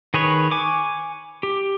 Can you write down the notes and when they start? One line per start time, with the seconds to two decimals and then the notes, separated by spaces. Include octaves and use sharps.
0.14 D#3 G#4 B4 C#5
0.51 G#5 C#6 D6
1.43 G4